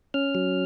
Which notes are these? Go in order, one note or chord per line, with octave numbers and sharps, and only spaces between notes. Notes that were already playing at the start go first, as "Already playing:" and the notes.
C#4 F6
F#3